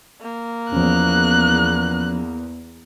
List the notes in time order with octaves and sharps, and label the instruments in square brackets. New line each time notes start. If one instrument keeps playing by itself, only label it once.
[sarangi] A#3
[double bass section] E2 [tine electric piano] F3 C#4 [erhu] F#6